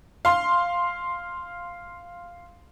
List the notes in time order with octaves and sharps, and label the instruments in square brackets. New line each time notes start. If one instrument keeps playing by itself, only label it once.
[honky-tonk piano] F5 C6